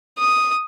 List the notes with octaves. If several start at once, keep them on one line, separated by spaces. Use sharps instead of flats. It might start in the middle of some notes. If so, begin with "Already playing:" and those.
D#6